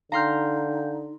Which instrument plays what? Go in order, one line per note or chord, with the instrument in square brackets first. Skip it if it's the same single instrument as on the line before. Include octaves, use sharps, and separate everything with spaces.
[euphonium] D3 [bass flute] D#4 [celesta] F5 G5 G6 [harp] A#5 C6 F6